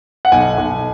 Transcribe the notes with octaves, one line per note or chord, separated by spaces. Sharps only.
F#5
B1 G#5
B1